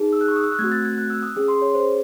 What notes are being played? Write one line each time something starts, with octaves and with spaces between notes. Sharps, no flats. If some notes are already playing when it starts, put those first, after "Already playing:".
Already playing: D#4 G#4
E6
F#6
C#6
D#6
E6
F#6
A3 C4 F#4 G#6
A6
G#6
F#6
E6
D#6
C#4 G#4
C6
C#5
C5